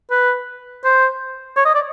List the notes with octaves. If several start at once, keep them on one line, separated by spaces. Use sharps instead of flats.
B4
C5
C#5
D#5
D5